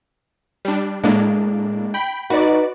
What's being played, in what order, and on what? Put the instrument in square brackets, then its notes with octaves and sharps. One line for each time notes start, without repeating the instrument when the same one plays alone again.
[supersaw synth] G3 D4
[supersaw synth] A2 A#3 D4 [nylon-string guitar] G#3
[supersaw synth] G5 B5
[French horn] D#4 [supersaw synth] F#4 D5 [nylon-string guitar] B4